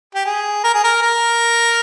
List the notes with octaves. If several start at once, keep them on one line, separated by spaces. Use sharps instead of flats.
G4
G#4
A#4
G#4
A#4
A#4